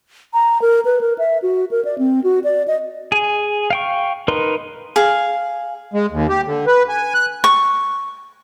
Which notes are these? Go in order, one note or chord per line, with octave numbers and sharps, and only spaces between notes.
A#5
A#4
B4
A#4
E5
F#4
A#4
D5
C4
F#4
D5
D#5
G#4 G#5
F5 G5 C#6
D#4 A#4 B4 C6
G#4 F5
G#3
D#2
G4
D3
B4
G#5
F#6
C#6